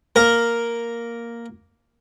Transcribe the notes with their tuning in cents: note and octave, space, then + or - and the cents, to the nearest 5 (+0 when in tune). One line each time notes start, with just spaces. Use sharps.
A#3 +0 A#4 +0